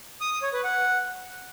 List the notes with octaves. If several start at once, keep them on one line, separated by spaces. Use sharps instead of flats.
D#6
D#6
C#5
B4
F#5